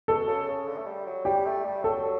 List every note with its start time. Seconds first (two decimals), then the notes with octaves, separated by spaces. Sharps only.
0.08 B2 A4
0.28 C#3
0.48 C#3
0.67 D3
0.77 A3
0.86 G3
1.06 F#3
1.25 G3 G4
1.46 A3
1.64 G3
1.83 F#3 A4